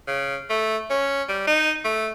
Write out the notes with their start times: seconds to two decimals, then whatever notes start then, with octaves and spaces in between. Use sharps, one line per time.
0.07 C#3
0.50 A3
0.90 C#4
1.29 G3
1.47 D#4
1.85 A3